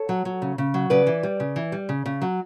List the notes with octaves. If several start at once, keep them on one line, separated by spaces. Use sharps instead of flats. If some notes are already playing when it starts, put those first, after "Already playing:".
Already playing: A4 C#5
F#3
F#3
C#3
C#3
F#3
C#3 B4 D5
E3
G3
C#3
E3
G3
C#3
C#3
F#3